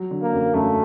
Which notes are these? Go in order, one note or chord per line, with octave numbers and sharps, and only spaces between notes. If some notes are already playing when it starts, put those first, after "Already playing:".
Already playing: F#3
D3
A#3
F#2
F#2 A3